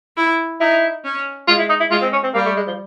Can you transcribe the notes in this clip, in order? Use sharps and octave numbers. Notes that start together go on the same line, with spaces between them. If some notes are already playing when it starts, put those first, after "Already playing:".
E4
D#4 E4
C#4
G#3 F4
E4
D#4
E4
G#3 F4
C4
C#4
C4
G3 A#3
A3
G#3
F3